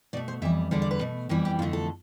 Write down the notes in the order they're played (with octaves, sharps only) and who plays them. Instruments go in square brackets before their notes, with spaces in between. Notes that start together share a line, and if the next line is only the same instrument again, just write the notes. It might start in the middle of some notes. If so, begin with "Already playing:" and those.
[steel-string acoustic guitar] B2 A3 D5
C5
F2 E3 G3 E5
E2 D3 G3 D5
D5
B4
B2 A3
F2 E3 G3 G4
G4
F2 F4
D3 A3
A4